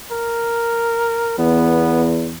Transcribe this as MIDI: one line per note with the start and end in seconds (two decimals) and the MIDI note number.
0.11 1.37 70
1.38 2.38 40
1.38 2.12 59